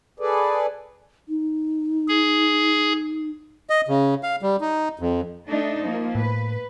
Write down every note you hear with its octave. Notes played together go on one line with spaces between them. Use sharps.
G#4 A4 B4 D5
D#4
G#4
D#5
C#3
F5
G3
D#4
F2
A3 D4 D#4
F3 A#3
A2 B4